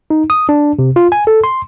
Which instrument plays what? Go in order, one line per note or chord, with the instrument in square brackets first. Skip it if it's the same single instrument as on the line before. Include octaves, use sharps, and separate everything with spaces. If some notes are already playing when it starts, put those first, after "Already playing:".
[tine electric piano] D#4
D#6
D4
C3
F4
G#5
A4
C6